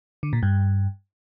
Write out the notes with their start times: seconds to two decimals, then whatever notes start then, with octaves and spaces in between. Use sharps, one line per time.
0.23 D3
0.33 A#2
0.43 G2